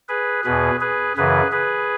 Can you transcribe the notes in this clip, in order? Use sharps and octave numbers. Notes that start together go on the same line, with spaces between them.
G#4 B4
E2 B2 G#4 B4
G#4 B4
F#2 C#3 E3 G#4 B4
G#4 B4